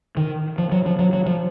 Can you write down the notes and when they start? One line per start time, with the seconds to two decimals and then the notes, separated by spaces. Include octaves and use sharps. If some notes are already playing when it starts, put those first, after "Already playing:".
0.17 D#3
0.58 F3
0.72 F#3
0.86 F3
0.99 F#3
1.13 F#3
1.26 F3